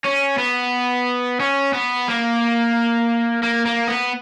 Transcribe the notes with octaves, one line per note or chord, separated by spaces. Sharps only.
C#4
B3
C#4
B3
A#3
A#3
A#3
B3